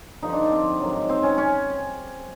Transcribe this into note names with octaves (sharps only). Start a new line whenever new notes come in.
G2 D3 F3 D#4
D4
D4
C4
G#2 D#3 F#3
C4
C#4
C#4